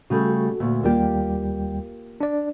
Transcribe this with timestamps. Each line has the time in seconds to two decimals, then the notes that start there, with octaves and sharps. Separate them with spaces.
0.10 C#3 G3 A3 F#4 A4
0.60 D2 A#2 A3
0.83 D#2 G3 A#3 F4 G4 G5
2.21 D4 D5